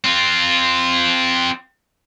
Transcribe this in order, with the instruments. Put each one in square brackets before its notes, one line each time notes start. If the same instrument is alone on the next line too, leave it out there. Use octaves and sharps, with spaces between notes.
[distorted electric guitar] C4 F4